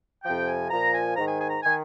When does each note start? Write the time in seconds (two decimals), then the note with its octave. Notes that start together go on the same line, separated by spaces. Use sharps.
0.24 F2 C3 F3 G5
0.48 G#5
0.70 A#2 F3 A#5
0.94 G#5
1.16 G#2 D#3 A#5
1.28 G#5
1.40 G#5
1.50 A#5
1.63 D#3 G#5